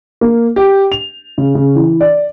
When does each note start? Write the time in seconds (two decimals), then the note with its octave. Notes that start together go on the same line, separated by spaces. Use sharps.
0.21 A#3
0.56 G4
0.92 F7
1.38 C#3
1.55 C#3
1.75 E3
2.01 D5